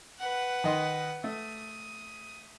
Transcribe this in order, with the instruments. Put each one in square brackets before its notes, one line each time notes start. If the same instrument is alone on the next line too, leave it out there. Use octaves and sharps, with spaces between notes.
[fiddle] B4 F#5
[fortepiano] D#3 D#5 C6
[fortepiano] A3 [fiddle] D#6